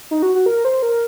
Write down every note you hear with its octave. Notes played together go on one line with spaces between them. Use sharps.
D#4
F#4
F#4
A#4
C5
A#4